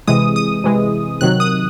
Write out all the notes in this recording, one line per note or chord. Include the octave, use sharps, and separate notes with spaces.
C3 E3 G#3 D#6
D#6
C3 E3 G#3
C3 D#3 F#3 F#6
D#6